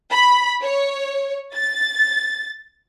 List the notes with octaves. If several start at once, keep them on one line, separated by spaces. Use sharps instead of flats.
B5
C#5
A6